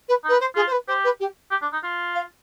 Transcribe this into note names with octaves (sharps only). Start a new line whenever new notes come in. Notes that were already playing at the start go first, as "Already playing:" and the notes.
B4
D#4 B4
C5
F4 G#4
C5
B4
G4 C5
B4
G4
G4
D4
D#4
F4
F5